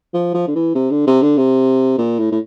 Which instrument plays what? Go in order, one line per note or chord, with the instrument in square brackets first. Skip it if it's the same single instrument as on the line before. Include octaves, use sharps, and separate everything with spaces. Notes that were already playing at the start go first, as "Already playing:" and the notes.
[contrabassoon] F3
F3
D3
E3
C3
D3
C3
D3
C3
A#2
A2
A2